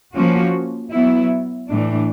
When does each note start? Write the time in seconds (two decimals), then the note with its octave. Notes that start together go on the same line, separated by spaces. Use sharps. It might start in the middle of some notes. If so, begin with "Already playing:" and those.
0.13 F3 A#3 C#4 F#4
0.92 F#3 B3 E4
1.69 A2 E3 A3 D4